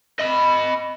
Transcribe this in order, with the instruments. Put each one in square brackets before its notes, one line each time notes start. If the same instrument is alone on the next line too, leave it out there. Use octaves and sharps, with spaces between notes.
[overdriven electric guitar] D#5 B5